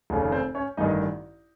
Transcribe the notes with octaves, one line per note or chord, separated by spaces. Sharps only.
F1 D#2 C#3
C4 C5
C#4 C#5
A1 G2 D#3 D#4 D#5